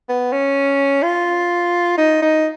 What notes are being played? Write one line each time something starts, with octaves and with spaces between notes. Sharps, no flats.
B3
C#4
F4
D#4
D#4